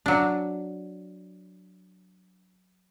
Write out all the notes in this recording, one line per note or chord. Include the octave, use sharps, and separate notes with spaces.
F#3 D4